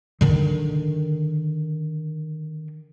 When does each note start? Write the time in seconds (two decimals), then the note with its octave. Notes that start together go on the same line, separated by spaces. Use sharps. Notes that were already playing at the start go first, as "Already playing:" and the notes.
0.21 D3 D#3